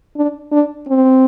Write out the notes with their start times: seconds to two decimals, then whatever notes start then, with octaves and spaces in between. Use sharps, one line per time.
0.16 D4
0.52 D4
0.88 C4